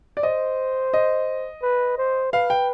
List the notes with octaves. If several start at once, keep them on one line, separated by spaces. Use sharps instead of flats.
D5
C5 D#5
D#5
B4
C5
B4 F5
G5